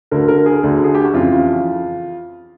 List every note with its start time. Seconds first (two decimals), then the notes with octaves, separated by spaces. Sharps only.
0.11 D2 D3 A#4
0.28 A#4
0.46 G#4
0.63 D2 D3
0.84 G#4
0.95 G4
1.04 F#4
1.14 F2 C#3 E3 F4